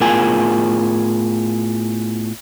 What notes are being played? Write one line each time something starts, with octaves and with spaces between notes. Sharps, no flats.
A2 B3 F4 G#4 A#4 G#5